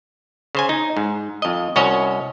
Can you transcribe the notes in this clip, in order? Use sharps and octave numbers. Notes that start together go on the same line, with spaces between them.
C#3 C5 G#5
D#4
G#2
F2 D#5
C2 C#4 F#4 C#5 D#5